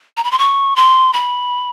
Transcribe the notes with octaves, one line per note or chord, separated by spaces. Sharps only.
A#5
B5
C6
C#6
C6
B5